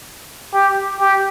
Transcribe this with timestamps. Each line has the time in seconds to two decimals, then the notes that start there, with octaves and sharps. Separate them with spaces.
0.54 G4
1.00 G4